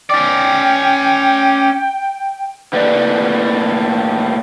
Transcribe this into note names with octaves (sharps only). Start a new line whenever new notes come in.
C#4 D5 G5
A2 A#3 B4 D5